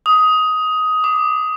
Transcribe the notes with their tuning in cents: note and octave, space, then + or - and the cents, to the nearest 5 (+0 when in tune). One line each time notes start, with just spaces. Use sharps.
D#6 +15
D6 +20